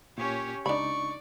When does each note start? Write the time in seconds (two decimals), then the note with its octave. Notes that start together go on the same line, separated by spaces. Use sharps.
0.18 A#2 C#4 G4 C#5
0.66 C#2 D4 D#4 D5 B5 C#6